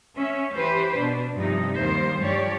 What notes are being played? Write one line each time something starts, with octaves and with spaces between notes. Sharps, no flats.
C#4 E5
E3 G4 B4 C5
B2 D4
G2 C3 F3 D#4
D#2 D#3 G3 A#3 C5
G2 F3 G4 C#5 D5